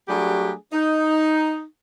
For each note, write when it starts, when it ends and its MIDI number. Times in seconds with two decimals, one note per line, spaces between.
0.09 0.53 54
0.09 0.53 55
0.09 0.53 57
0.09 0.53 62
0.09 0.53 67
0.09 0.53 68
0.73 1.63 63